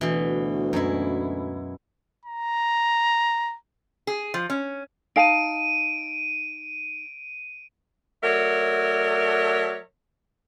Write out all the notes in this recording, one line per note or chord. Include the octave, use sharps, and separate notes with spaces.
D2 B2 E3
F#2 G#3 E4
A#5
G#4
F3
C#4
D#4 F5 A5 D7 D#7
F#3 A3 A#4 C#5 D5 E5